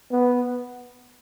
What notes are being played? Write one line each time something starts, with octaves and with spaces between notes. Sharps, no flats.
B3